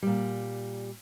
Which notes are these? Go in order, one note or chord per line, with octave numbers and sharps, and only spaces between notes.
A#2 G3